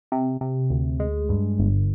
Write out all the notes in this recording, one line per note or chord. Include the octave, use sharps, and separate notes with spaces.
C3
C3
D2
G#3
G2
G1